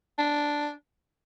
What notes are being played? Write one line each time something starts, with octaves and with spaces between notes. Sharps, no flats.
D4